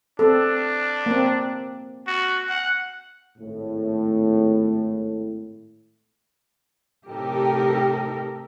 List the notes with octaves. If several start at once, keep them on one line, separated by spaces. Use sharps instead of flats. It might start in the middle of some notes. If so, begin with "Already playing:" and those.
C4 D4 A4
A#3 C4
F#4
F#5
G#1 A2
A2 C3 D#4 G4 A4 A#4